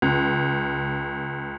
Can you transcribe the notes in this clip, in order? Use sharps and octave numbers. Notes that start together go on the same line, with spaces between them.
C#2